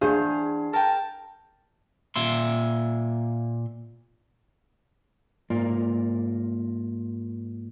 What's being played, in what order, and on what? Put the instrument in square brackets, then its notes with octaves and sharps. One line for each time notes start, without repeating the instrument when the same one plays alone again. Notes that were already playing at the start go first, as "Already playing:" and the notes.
[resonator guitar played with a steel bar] E2 C5 F5 [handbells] D4 [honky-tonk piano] G#4
[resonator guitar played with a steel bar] A#4 G5 [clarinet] A5
[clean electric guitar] A#2 E5 C6
G#2 A#3 F4 A#4 D5